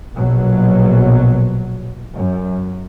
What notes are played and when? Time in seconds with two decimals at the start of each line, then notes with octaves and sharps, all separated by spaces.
0.15 A#1 B2 F#3
2.15 F#2